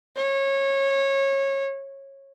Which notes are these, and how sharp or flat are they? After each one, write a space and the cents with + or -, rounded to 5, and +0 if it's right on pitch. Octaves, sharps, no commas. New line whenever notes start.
C#5 -20